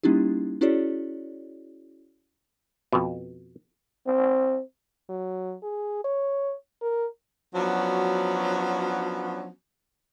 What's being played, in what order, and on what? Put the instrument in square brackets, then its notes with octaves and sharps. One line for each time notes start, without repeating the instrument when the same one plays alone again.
[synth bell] G3 A#3 C#4 D#4 E4 G4
C#4 E4 F#4 G#4 C#5 D5
[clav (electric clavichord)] F2 B2
[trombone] C4
[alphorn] F#3
G#4
C#5
A#4
[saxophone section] F3 F#3 B3 C#4 D4 F#4